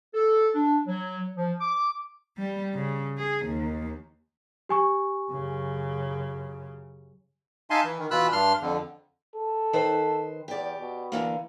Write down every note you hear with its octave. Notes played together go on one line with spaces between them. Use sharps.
A4
D4
F#3
F3
D6
G3
C#3
G#4
D#2
G4 G#5 C#6
F#2 C#3
D#4 E5 F5 G#5 A5 C6
E3
D#3
B2 E3 F4 B5 E6 F#6
G2 D4 C6 F6
F2 D3
A4
D#3 B4 C5
E2 G4 D5
B2
D3 E3 A#3